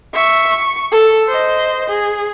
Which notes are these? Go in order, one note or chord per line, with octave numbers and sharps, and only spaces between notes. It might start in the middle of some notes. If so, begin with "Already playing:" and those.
E5 C#6
C#6
A4
C5 D#5
G#4